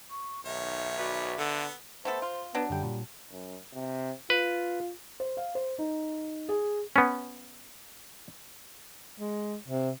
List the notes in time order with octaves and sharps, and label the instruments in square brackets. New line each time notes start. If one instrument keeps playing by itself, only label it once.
[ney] C#6
[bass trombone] B1 [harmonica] D#3 C#5 [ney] E5
[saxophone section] F#4 B4 D5
[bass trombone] D3 [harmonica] B3 [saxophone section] A4
[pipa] A3 B3 A4 [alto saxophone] C5
[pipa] F4
[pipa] F#3 D4 [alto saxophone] B3
[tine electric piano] F#2 D3 G5 [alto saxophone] G3
[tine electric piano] A#2
[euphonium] F#2
C3
[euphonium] F4 [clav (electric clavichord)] B4
[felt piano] C5
F5
C5
D#4
G#4
[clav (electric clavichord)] B3 C#4
[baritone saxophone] G#3
C3